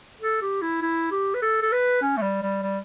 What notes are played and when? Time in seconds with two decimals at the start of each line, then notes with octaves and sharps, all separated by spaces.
0.21 A4
0.41 G4
0.62 E4
0.82 E4
1.11 G4
1.34 B4
1.42 A4
1.62 A4
1.72 B4
2.02 C#4
2.17 A3
2.22 G3
2.42 G3
2.62 G3